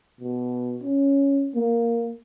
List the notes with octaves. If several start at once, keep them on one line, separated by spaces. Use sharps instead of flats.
B2
C#4
A#3